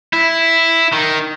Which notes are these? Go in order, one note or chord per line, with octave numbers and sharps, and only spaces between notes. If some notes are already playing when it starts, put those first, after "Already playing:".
E4
D#3